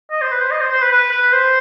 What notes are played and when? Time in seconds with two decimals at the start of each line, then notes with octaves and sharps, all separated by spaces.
0.11 D#5
0.21 C5
0.31 B4
0.41 C5
0.51 D#5
0.61 C5
0.71 C5
0.81 B4
0.92 B4
1.11 B4
1.32 C5